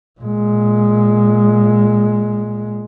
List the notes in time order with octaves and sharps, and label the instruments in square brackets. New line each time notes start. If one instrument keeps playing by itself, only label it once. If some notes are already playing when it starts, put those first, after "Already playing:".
[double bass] A#2 G#3